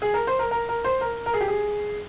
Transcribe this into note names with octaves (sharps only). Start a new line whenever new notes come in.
G#4
A#4
C5
A#4
A#4
A#4
C5
A#4
A#4
G#4
G4
G#4